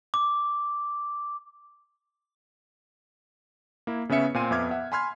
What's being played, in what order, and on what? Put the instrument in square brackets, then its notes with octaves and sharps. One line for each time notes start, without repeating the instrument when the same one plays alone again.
[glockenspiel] D6
[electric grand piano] A#3 E4
C#3 B3 C#4 E5 C#7
A#2 C4 F5 G#5 C6 D#7
F2 B3 E5 D6 F6 G#6
E5 F#5
G#5 B5 C6 F6 G#6